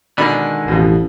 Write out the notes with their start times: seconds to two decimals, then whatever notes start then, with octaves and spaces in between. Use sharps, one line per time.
0.18 B2 D3 D#3 G#3 D4 B5
0.68 A1 F2 B2